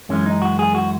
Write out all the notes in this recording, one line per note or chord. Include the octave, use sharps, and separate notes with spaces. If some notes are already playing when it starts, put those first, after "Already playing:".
F#2 E3 G#3 C#4
D#4
F#4
G#4
F#4